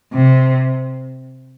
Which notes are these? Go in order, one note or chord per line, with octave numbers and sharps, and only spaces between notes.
C3